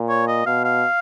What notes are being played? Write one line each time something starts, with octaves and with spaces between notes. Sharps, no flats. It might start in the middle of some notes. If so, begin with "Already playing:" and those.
Already playing: A#2
C#5
D#5
B2 F5
F5